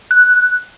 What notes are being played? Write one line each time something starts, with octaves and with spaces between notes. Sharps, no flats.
F#6